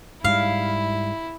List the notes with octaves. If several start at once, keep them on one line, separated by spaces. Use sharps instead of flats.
G#2 G3 E4 F5